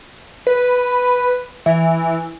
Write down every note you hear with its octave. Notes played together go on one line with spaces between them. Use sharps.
B4
E3